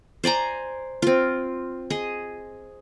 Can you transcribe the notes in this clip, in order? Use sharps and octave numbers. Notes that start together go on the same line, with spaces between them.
C5 D5 G#5 A#5
C4 F4
G#4 D#5